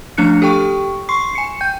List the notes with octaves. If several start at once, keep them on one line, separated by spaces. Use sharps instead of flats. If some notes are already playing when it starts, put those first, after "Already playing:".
F3 A3 C#4 D4 F#6 C#7
G4 A4 G5 C#6
C6 C#6 C7
G#5 C#7
G5 G6